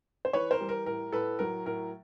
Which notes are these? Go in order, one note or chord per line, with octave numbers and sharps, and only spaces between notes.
C5
E3 B4 C#5
A#4 C5
G3
A#4
A2 A#4
A2 A4 B4
F#3 A#4
A2 A#4